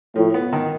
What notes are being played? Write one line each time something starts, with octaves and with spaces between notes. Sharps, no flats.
A2 F3
B3
D#3